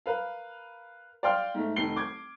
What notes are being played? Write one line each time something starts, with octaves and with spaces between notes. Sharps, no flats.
A#4 B4 F5
D5 F5 G5 C6 F6
G#2 A3
F1 D#3 C7 G7
D6 G#6